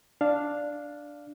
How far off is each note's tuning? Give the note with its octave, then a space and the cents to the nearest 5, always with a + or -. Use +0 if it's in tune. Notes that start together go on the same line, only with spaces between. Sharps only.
D4 +0 F5 +0